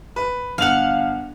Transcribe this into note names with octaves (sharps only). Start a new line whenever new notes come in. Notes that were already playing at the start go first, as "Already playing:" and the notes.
B4
G1 F5 F#5 F7